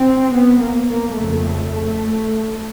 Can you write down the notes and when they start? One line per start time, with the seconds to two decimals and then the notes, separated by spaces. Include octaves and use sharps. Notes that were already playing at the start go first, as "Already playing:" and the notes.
Already playing: C4
0.33 B3
0.62 A#3
0.90 A#3
1.17 F2 C#3 A3